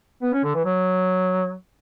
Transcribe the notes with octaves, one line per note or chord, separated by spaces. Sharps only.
B3
C#4
D3
E3
F#3